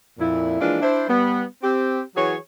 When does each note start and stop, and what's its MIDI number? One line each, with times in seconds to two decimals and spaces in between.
0.19 0.58 41
0.19 0.58 46
0.19 0.58 64
0.60 0.78 52
0.60 0.78 53
0.60 0.78 56
0.60 0.78 58
0.60 0.78 62
0.60 0.78 65
0.81 1.05 62
0.81 1.05 64
0.81 1.05 72
1.08 1.43 55
1.08 1.43 59
1.62 2.01 60
1.62 2.01 67
2.15 2.35 52
2.15 2.35 54
2.15 2.35 66
2.15 2.35 68
2.15 2.35 73